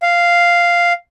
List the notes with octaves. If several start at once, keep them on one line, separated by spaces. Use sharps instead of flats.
F5